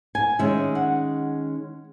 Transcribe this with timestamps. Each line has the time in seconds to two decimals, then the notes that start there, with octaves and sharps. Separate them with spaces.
0.15 G#5
0.39 D#3 G#3 C#4 E5
0.75 F#5